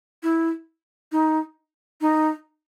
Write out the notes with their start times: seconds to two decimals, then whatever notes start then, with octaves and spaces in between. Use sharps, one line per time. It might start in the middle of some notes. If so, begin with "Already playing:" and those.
0.23 E4
1.12 D#4
2.01 D#4